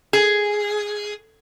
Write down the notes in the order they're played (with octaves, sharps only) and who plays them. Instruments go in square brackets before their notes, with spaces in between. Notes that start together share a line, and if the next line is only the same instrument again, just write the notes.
[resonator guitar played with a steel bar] G#4